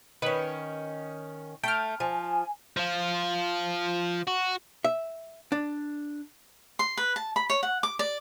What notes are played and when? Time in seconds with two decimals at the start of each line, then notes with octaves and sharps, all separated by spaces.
0.22 D#3 C#4 B4
1.64 A3 G5 F6
2.00 F3 G#5
2.76 F3 F4
4.28 F#4
4.84 E5
5.52 D4
6.79 C6
6.97 B4
7.16 A5
7.36 B5
7.50 C#5
7.63 F#5
7.83 D6
7.99 D5